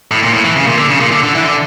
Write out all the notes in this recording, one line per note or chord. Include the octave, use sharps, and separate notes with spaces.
A2
A#2
A2
E3
C#3
A#2
D3
C#3
A#2
D3
D3
E3
D3